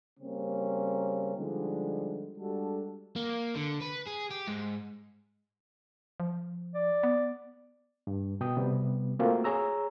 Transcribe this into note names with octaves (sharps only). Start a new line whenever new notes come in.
C#3 G3 A#3 C4 C#4
D3 F3 G3 G#3 D#4
G3 G#3 D4 F#4 A4
A#3
D3
B4
G#4
G4
G#2
F3
D5
B3
G2
B2 G5 D#6
C3 G3 B3
A3 A#3 C4 F4 F#4
G#4 C#5 A#5 E6